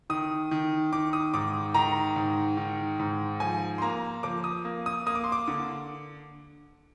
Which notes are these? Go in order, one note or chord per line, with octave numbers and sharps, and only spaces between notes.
D#3 D#6
D#3
D#3 D6
D#6
G#2 D6
D#3 A#5
G#2
D#3
G#2
F3 G#5
C6
A#3 A#5
F3 D6
D#6
A#3
D#6
A#3 D#6
D6
C6
D6
D3